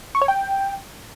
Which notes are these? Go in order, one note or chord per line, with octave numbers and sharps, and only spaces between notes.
C#6
C#5
G5